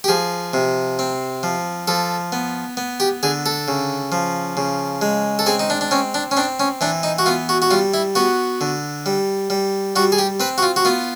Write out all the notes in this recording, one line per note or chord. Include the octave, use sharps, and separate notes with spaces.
G4
F3 G#4
C3
C4
F3
F3 A4
B3
B3
G4
D3 G#4
A4
C#3
F3
C#3
G#3
A4
C4 G#4
D#4
D4
D4
C4 C#4
D4
C#4
C4 D4
C#4
E3 D4
D#4
F#4
B3 F4
F#4
F#4
G3 F4
E4
B3 F#4
D3
G3
G3
G3 F#4
G#4
G4
C4 B4
F#4
F4
F#4
B3 F4